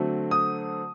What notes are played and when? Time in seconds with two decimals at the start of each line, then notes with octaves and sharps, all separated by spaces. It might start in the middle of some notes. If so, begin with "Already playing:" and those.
Already playing: D3 F#3 A3 C4
0.31 D#6